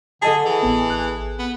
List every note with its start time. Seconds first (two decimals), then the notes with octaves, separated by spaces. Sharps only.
0.22 D3 G#4 A4 D#5 A5
0.45 E3 G#4
0.63 A1 B3
0.90 F#6
1.39 B3